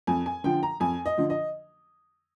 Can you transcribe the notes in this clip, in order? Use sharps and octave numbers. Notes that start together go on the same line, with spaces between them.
F2 G#5
G#5
D3 F3 G5
A#5
F2 G#5
D#5
D3 F3
D#5